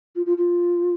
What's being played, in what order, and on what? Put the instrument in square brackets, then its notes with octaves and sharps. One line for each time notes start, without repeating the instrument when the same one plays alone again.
[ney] F4
F4
F4